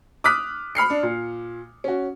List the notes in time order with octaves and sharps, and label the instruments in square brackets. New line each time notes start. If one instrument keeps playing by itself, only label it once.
[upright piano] D6 D#6 F6 F#6 B6
B5 F6 C7 C#7
D4
A#2
C#4 F#4